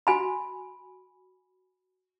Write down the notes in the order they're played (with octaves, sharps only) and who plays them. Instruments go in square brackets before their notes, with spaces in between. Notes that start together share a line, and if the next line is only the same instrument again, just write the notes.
[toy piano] F#4 G#5 B5